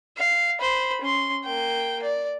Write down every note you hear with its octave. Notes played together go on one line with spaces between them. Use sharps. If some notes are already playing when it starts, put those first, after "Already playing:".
F5
C5 B5
C#4 C6
A#3 G5
D5